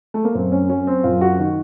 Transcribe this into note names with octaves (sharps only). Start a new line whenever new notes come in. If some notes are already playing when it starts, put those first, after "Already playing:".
A3
A#3
F#2 C4
C#4
F#3 C#4
C4
F#2 F4
F#4
D#3